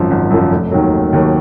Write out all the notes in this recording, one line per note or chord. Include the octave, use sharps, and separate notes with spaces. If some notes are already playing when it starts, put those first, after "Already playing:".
Already playing: G#1 F#2 F3
G#1
F#2 F3
F1
D#2 D#3 F#3
F1
D#2 D#3 F#3